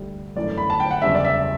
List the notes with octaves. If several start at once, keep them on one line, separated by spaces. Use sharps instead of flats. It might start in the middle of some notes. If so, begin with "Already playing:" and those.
Already playing: D2 D3 G3
G1 F#2 E3 A3 D5
B5
A5
G5
F#5
F#1 E2 C#3 G3 E5
D5
E5